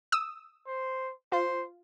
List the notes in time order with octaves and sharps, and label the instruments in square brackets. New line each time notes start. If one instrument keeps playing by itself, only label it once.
[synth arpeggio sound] D#6 E6
[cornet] C5
[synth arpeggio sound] F4 [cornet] C5